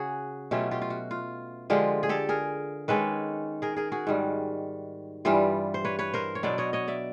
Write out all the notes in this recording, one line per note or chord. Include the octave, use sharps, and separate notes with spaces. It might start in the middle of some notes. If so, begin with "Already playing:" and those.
Already playing: C#3 F#4 G#4
B2 F#3 A3 C#4 F4 G4
F4 G4
F4
F#4
F4
D3 F3 G#3 F4 G4
G#4
G4 A4
G#4 A#4
D#3 G#3 C#4 A4 B4
G#4 A#4
G#4 A#4
F#4 G#4
G#2 D#3 G3
G2 E3 G3 F4 G4
C5
B4 C#5
B4 C#5
A#4 C5
C#5
B2 F#3 B3 D4 C5 D5
C#5 D#5
C#5 D#5
D5 E5